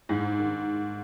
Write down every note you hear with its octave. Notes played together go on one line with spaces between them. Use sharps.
G#2
D#3